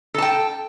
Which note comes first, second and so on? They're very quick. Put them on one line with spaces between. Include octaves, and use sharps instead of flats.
A4 A5 G5